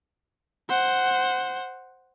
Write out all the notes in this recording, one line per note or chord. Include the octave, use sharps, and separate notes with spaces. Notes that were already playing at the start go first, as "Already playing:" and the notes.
C5 F#5